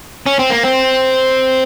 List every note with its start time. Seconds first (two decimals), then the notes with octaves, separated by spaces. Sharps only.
0.26 C#4
0.39 C4
0.50 A#3
0.63 C4